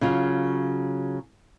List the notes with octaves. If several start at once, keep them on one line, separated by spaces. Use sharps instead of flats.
C#3 F#3 F4